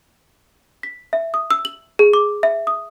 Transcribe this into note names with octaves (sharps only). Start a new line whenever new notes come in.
B6
E5
D#6
E6
F#7
G#4
D6
E5
D#6